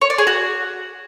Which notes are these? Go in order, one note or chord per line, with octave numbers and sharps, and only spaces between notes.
C#5
D5
G#4
F#4